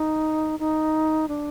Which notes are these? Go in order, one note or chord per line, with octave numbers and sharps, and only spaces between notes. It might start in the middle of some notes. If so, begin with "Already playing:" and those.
Already playing: D#4
D#4
D4